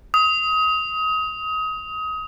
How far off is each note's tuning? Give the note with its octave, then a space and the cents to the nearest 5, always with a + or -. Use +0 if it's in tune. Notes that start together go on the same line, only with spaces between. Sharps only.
D#6 +25